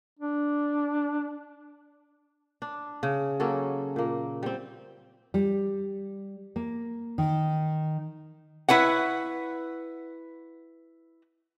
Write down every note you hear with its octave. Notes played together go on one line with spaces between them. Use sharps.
D4
D4
C#3
F#3 A#3 C#4 A4
A#2 A#3
G3 C4
G3
A#3
D#3
E4 B4 C#5 F#5